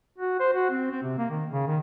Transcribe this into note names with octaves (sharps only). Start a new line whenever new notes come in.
F#4
C5
F#4
C4
C4
C3
A#3
D#3
C#3
D#3